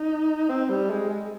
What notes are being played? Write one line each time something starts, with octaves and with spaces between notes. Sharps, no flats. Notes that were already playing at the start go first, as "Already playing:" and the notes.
Already playing: D#4
C4
G3
G#3
G#3